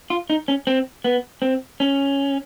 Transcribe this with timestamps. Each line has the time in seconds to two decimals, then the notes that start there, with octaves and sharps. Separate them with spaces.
0.10 F4
0.30 D#4
0.48 C#4
0.67 C4
1.04 B3
1.42 C4
1.80 C#4